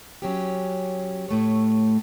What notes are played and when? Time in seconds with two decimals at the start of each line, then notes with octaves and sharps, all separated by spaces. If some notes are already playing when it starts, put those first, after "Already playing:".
0.22 F#3 C#4 G4
1.29 A2 A3 C#5